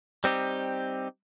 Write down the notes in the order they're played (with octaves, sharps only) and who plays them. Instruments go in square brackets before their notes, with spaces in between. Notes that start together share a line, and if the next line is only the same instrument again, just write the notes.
[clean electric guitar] G3 C4 D#4 G4